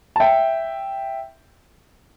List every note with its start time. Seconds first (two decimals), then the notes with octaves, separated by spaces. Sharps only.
0.16 A5
0.20 E5 G5